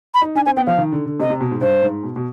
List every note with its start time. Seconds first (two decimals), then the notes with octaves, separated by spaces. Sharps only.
0.14 B5
0.22 D#4
0.35 D4 G#5
0.46 C4 G#5
0.57 B3 G5
0.67 F3 F5
0.78 D#3
0.92 D3
1.06 D3
1.20 C3 D#5
1.30 C3
1.41 B2
1.51 G#2
1.61 G2 C5
1.83 G#2
2.03 B2
2.16 B2